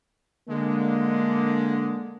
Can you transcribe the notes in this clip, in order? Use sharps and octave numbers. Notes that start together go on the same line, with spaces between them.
D3 G#3 A#3